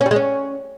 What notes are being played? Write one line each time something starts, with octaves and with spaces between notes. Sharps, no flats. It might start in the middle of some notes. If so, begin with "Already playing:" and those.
C#4
G3
G#3
C#4